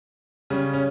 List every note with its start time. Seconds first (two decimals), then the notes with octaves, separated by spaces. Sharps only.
0.50 C#3 G3 C#4
0.73 C#4